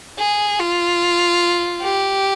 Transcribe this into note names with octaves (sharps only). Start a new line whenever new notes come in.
G#4
F4
G4